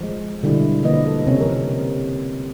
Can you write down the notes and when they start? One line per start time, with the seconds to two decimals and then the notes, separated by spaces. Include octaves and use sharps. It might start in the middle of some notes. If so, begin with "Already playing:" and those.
0.01 F3 G#3
0.43 B2 D3 G3 E4
0.83 D3 F3 A#3 B4 D#5
1.07 A4
1.27 C3 C4 C#4 C#5
1.41 F3 A#4